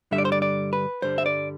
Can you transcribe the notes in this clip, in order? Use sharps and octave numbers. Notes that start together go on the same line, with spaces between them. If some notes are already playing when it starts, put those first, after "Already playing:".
G2 D3 G3 E5
D5
C5
D5
D5
B4
G2 D3 G3 C5
E5
D5